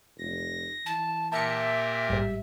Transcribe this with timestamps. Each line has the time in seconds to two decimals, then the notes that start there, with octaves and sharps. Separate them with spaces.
0.19 F1 A#6
0.86 E3 A5
1.32 A#2 G4 A#4 E5 A5 C#7
2.09 A1 G#2 G3